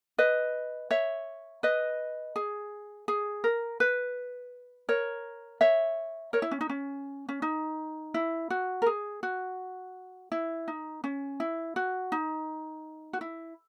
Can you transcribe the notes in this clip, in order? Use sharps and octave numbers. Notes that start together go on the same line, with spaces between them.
B4 D#5
C#5 E5
B4 D#5
G#4
G#4
A#4
B4
A#4 C#5
C#5 E5
A#4 C#5
E4
C#4
D#4
C#4
C#4
D#4
E4
F#4
A#4
G#4
F#4
E4
D#4
C#4
E4
F#4
D#4
F#4
E4